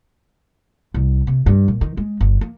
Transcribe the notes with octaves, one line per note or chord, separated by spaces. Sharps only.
C2
C3
G2
A#2
D#3
G#3
G1
A#3